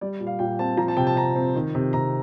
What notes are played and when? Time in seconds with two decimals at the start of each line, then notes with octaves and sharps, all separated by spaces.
0.01 G3 D5
0.20 A#2
0.27 F5
0.39 A#2 G5
0.59 C4 A5
0.77 F3 A#5
0.88 A5
0.97 C3 G5
1.07 A5
1.16 C3 A#5
1.35 C4
1.55 D#3
1.75 C3
1.93 C3 A#5